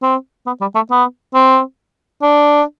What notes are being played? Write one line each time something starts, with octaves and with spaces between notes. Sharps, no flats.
C4
B3
G3
A3
B3
C4
D4